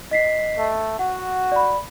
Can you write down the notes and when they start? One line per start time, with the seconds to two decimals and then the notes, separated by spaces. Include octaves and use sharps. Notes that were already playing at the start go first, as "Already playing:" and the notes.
0.11 D#5 B6 C7
0.58 A3
0.99 F#4 F#5
1.52 D5 B5